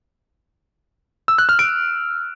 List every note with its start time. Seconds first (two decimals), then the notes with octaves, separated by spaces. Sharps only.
1.28 E6
1.38 F#6
1.49 F6
1.59 D7